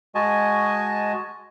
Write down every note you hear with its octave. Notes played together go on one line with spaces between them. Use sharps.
G#3 F#4 D#5 G#5 A5